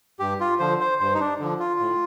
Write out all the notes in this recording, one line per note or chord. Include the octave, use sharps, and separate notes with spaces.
G2 G4
F4
D3 F3 C5
C5
G2 C5
D#4
D4
D3 F3
F4
A2